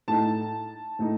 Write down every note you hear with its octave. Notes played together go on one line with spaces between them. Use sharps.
A2 A3 D#4 A5
A2 A3 D#4